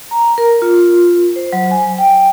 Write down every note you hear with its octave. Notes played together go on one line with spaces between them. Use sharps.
A#5
A#4
F4
C5
F#3
G#5
G5